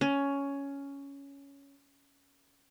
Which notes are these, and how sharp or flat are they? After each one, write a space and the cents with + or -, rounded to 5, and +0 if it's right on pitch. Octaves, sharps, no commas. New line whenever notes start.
C#4 +10